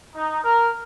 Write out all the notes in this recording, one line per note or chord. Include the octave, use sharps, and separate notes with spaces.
D#4
A#4